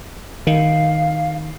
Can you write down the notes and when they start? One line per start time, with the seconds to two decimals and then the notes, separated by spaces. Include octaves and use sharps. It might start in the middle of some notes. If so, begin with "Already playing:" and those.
0.47 D#3 F5